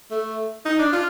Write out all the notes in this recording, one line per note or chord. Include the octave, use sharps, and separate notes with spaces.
A3
D#4
D4
F4